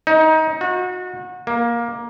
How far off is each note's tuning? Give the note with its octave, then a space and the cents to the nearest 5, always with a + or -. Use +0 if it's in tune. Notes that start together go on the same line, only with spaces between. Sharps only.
D#4 +25
F#4 -30
A#3 +15